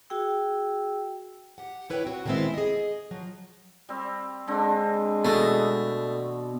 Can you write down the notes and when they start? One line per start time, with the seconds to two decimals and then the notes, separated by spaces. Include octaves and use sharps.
0.10 F#4 G#4 G5 E6
1.58 G4 F#5
1.90 A3 E4 B4 C#5 D#5 G5
2.04 C4 F#4
2.26 D3 D#3 G#3 B3 C4 E4
2.54 G#4 D#5
3.11 F3 F#3 G#4
3.89 G3 C4
4.47 D3 G#3 C4 D4
5.25 B2 A3